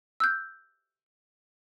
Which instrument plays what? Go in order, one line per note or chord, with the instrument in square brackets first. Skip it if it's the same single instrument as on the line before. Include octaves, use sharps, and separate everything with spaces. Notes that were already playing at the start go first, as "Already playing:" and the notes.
[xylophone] E6 F#6 G6